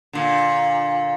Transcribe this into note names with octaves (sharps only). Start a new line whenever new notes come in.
A#2 D3